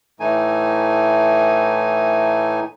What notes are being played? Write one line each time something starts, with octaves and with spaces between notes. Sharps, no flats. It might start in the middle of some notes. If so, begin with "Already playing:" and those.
A2 E3 A3 D#4 G#5